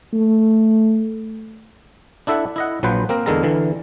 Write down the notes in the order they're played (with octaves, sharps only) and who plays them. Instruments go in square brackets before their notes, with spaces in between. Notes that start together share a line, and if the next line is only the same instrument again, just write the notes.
[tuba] A3
[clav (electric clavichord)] D4 E4 A4 E5 F#5
E4 D#5 F#5
A#1 F3 F#3 B4 C5
A#3 C4 A#4
E2 D3 G#3 A4 A#4 A#5
D3 E3